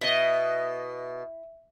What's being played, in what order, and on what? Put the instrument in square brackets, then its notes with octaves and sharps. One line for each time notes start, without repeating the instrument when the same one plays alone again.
[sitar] B2 D#5 [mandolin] E4